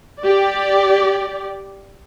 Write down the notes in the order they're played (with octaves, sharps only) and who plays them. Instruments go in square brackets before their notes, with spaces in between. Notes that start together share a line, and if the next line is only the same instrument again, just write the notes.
[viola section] G4 D5